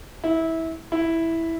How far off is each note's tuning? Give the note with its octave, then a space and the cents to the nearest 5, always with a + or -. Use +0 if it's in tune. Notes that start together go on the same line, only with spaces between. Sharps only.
E4 -20
E4 -5